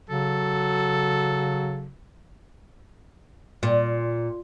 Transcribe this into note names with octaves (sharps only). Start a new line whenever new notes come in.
C#3 F#3 A4
A#2